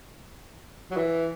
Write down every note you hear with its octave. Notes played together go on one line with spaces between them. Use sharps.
F#3
E3